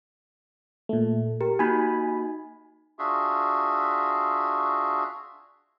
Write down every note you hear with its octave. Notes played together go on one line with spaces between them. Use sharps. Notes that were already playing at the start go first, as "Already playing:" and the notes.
A#2 A3
G4 A#4
A#3 D#4 F#4 G#5 B5
D4 F4 F#4 G#4 E5